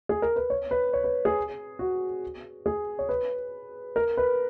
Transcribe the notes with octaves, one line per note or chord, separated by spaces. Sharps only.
G#4
A#4
B4
C#5
B4
C#5
B4
G#4
F#4
G#4
C#5
B4
A#4
B4